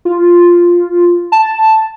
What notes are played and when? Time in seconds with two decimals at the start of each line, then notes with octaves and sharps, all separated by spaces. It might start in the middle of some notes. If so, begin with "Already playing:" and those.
0.05 F4
1.32 A5